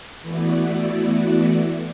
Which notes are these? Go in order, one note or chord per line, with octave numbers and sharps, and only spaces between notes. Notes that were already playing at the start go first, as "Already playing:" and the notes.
E3 A3 B3 E4 F#4 D5